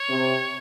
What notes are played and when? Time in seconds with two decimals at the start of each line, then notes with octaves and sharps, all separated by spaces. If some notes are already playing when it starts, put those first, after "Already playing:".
Already playing: C#5
0.10 C3